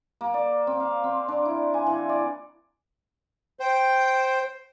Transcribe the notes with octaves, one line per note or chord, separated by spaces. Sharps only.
A#3
D5
C4
F5
C4
D4
E4
G#5
E3
D5
C5 G5